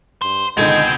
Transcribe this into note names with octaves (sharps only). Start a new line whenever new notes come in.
G2 C5
C#2 B2 D3 D#3 C4 D#5 G5 G#5